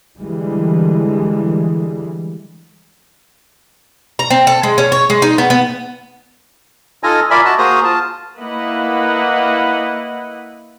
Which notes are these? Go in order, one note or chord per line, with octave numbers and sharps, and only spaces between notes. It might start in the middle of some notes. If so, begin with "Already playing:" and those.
D3 E3 G3 G#3
A#5
C4
A4
G#3
C#4
C#5
G#3
D#4
B3
B3
D#4 F4 A4 D#5 G#5 A#5
F4 A#4 D5 E5 G#5 B5
F#4 D#5 A5
A#3 F#4 G#4 C5 A#5 D#6
F4 A5
A#3 E4 B4 D#5 F#5